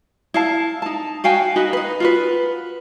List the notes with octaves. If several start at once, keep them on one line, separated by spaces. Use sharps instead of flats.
E4 F5 A5
D#4 A5
F#4 F5 G5 G#5
D#4 F#4 B4 D#5
D#4 B4
F4 F#4 B4